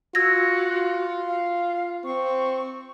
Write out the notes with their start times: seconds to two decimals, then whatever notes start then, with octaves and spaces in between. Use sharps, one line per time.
0.15 F4 F#4 E6 G#6 A#6
1.27 F5
2.04 C4 C#6